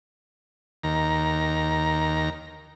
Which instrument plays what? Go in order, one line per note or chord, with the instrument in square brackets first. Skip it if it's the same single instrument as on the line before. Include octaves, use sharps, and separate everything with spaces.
[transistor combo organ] D#2 A#5